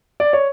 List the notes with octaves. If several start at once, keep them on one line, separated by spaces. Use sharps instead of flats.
D5
C#5